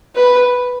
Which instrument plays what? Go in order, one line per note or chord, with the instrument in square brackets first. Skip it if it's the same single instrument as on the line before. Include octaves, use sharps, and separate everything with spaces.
[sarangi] B4